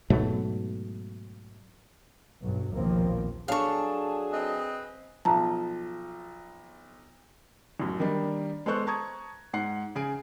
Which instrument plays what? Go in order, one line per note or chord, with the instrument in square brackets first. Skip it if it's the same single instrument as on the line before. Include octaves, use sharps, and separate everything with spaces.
[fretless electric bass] G#2 B2 F#3 A3
[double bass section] B1 G2 F#3
A#1 D#2 B2 F3 A#3 C4
[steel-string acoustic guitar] F#3 D4 A4 [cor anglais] G#4 [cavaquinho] F5 C#6
[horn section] C4 B4 D#5
[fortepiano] B1 F3 [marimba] A5 A#5
[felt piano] A1 F#2
D#3 G3 A#3 D4 D#4
G#3 B3 A4 C5 C#6 F#6
A5 A#5 C#6 D#6 G#6
G#2 F#5 C7
C#3 G#4 G#5 D7